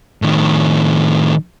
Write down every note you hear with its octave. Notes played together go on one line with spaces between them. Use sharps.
A2 D#3